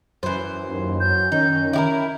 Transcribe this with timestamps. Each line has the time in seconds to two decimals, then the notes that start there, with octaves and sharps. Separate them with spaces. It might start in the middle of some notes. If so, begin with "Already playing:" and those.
0.23 F#2 E3 C5
0.68 D#2
1.00 F#3 G6
1.32 D#3 C#4 D#4
1.73 E4 G4 A#4